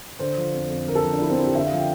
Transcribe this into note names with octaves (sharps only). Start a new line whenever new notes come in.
D3 C5
F3
F2
F2
D3 A#4
A4
F3
D4
F2 E4
C4
F2 E4
G4
D3 E5
F5
F3
G5